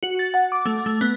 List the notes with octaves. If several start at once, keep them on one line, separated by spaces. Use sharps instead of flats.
F#4
A6
F#5
D6
A3
A3
B3